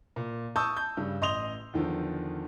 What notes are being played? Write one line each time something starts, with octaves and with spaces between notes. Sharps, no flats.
A#2
A5 C#6 D#6 E6 G6
G6
G2 C#3
A1 D#5 C6 D#6 F7 G7
E2 D3 D#3 F3